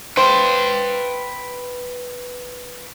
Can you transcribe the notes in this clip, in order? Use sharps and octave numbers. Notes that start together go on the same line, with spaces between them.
B4 C5 G5